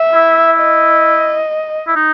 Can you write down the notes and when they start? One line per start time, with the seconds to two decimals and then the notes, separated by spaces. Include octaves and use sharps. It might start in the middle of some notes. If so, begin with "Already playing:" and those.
Already playing: E5
0.14 E4
0.60 D#5
1.88 E4
1.96 D#4